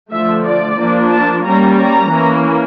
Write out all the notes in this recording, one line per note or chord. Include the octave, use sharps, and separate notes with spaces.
D3 F3 A3 E5
D5
F3 A#3 D4
A5
G3 A#3 C#4 A#5
A#5
E3 A#3 C#4